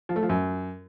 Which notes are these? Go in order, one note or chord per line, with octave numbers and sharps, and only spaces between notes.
F3
A3
F3
F#2